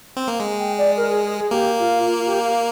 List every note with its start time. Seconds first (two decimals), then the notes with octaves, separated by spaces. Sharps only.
0.17 C4
0.28 A#3
0.40 G#3
0.59 G5
0.77 D5
0.96 A#4
1.09 G#4
1.24 G#4
1.37 G#4
1.51 A#3 G4
1.79 F4
2.06 F4
2.26 G4
2.44 F5